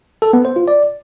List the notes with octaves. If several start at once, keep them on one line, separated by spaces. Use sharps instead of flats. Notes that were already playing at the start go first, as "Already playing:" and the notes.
A4
B3
C5
F4
D5